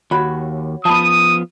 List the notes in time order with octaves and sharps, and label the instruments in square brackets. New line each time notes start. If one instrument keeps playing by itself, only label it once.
[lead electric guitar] D#2 [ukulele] F#4 C#5 B5
[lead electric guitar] F3 B3 [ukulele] A5 B5 [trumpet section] D#6